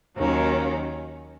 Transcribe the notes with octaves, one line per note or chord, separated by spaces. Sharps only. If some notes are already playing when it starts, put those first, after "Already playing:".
D#2 D#3 F#3 C#4